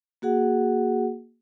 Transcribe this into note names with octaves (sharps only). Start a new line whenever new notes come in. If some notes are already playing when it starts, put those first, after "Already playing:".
A#3 F#4 G#4 F#5